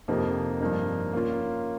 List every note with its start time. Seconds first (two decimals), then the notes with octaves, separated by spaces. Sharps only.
0.08 F2 C3 F3 A#3 D#4
0.61 G2 F3 A#3 D#4
1.13 A#3 C#4 F4